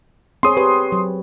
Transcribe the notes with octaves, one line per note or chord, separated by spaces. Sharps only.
C4 G#4 C#5 C6 D#6
G4 B4
F#3